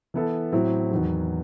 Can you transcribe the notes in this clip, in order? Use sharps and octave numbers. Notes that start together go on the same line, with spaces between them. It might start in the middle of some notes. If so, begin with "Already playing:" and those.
E3 B3 E4 A4
A2 F#3 C4 E4
E2 D#3 F#3